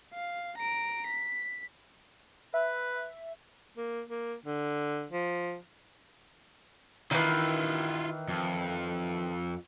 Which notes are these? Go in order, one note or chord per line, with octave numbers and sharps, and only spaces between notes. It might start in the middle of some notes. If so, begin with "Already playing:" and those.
F5
A#5 D7
B6
B4 E5
A#3
A#3
D3
F3
D#3 E3 E4 F4
F2